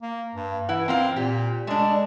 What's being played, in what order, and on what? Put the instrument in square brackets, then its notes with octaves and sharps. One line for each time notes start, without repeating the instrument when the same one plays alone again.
[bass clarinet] A#3
G2
[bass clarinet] E3 [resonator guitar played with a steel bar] E4 F#5
[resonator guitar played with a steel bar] A#3 F4 F5 [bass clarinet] C4
[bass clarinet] A#2 [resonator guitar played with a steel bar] G4
[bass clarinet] G#3 [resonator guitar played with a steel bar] A3 D4